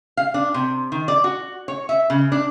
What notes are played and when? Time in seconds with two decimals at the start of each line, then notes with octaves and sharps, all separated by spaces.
0.17 F5
0.34 D4
0.54 C3
0.92 D#3
1.08 D5
1.24 F#4
1.68 C#5
1.89 E5
2.10 C#3
2.32 D4